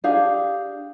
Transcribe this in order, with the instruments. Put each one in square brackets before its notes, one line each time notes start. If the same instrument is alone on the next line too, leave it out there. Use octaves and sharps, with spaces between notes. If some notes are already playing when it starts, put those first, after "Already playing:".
[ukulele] D4 G4 G#4 F5